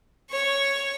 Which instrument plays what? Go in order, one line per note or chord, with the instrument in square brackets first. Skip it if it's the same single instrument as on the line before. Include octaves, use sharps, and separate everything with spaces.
[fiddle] C#5 C#6